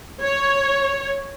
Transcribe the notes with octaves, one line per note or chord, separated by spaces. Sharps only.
C#5